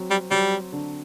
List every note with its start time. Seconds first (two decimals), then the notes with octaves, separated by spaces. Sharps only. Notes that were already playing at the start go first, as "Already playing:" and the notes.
Already playing: F#3 C4
0.10 G3
0.31 F#3 G3
0.72 D3